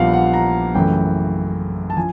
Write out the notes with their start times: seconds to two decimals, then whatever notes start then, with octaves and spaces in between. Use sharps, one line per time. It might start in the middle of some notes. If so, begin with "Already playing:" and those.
Already playing: A#1 A#2 G3 B3 F5 F#5
0.13 F#5
0.33 A#5
0.75 F#2 C#3 E3 A3 G5
1.90 A5
1.97 F3 G#5